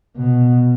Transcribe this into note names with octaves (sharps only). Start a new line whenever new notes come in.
B2